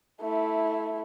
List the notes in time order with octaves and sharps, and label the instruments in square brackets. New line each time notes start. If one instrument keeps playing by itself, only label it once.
[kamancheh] A3 E4